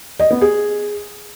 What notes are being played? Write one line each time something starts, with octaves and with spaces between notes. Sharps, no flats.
D#5
B3
G#4